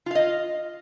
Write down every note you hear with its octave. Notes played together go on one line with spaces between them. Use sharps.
F4 D#5 F5